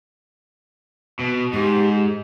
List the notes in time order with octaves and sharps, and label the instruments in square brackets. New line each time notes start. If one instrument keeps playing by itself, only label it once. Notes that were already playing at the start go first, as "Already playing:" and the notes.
[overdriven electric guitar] B2
[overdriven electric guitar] G#2 [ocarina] G4